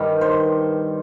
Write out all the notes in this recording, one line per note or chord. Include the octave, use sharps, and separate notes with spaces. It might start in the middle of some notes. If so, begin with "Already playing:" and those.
Already playing: G2 D#3 G3
C5